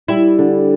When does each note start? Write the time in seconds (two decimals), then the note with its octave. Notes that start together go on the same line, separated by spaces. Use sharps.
0.08 G3 E4
0.38 D3